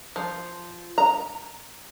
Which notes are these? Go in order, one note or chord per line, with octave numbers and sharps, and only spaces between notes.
F3
A#5